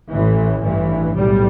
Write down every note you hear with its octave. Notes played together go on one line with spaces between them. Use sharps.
A1 A2 E3
A1 G2 E3
B1 A2 G3